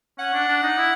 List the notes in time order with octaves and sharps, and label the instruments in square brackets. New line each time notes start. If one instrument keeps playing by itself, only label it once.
[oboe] C#4 [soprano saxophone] F#5
[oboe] D4
D4
D#4
E4